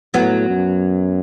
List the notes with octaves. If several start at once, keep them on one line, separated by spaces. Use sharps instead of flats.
A2 F#3 B3
F#2